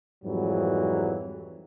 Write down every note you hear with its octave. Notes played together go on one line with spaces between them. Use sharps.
F2 G#2 E3 F#3 G3